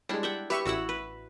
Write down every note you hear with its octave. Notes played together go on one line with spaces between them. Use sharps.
G3 G#3 D4 E4
E5 F#5 G5
G4 B4 E5 C#6
A1 E4 F#4 F#5 E6
B4